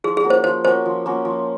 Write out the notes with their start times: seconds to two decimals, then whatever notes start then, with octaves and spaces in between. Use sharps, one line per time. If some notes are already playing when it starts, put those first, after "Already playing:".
0.04 F3 G#4
0.17 G#4
0.24 A#3 C#4 F#4
0.30 C5
0.44 F3 C5
0.65 A#3 C#4 F#4 C5
0.86 F3
1.06 A#3 C#4 F#4
1.25 F3